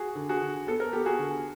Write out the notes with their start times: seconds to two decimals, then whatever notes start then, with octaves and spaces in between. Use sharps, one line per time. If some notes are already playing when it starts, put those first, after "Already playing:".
Already playing: F#4 G#4
0.16 D3
0.29 F#4 G#4
0.42 D3
0.67 B3 A4
0.80 A#4
0.93 B3 G4 A4
1.06 F#4 G#4
1.19 D3